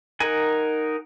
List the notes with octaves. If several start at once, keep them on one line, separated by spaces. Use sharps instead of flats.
D#4 A#4 F#5 G#5